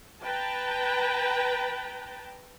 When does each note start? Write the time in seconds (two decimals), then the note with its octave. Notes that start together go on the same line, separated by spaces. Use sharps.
0.23 B4 G5 A5 A#5